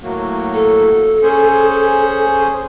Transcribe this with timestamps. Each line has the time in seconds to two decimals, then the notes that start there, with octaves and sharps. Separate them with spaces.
0.02 A2 F#3 A#3
0.54 A4
1.23 C#4 G#4 C5